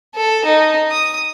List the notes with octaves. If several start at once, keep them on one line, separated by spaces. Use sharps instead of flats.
A4
D#4
D#6